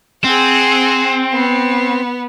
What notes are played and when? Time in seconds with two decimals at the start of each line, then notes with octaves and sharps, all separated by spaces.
0.24 C4 G#4 F#5
1.32 B3